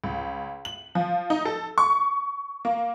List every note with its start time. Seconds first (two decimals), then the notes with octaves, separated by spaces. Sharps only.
0.04 C#2
0.65 F#7
0.95 F3
1.30 D#4
1.45 A4
1.78 C#6
2.65 A#3